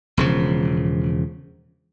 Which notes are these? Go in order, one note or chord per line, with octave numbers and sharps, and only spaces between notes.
E1 C#3 F3